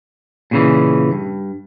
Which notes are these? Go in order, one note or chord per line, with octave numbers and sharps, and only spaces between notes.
A#2 C#3 E3
G2